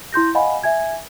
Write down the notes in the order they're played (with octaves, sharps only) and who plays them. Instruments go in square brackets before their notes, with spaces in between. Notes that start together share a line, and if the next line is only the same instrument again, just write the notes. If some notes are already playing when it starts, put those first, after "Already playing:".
[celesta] E4 C6 G6 A#6
D#5 F5 F#5 G#5 B5
E5 G#5 G#6